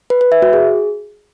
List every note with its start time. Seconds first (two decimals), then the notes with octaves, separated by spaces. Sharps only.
0.10 B4
0.21 B4
0.32 E5
0.42 F#4
0.53 G#4